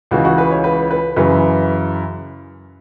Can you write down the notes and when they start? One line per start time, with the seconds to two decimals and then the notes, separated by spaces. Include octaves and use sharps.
0.11 C#2 C#3 E3 F#4
0.25 F#4
0.38 B4
0.51 C#5
0.64 B4
0.91 B4
1.17 F#2 C#3 E3 B4